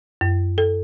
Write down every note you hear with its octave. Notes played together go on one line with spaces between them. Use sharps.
F#2
A4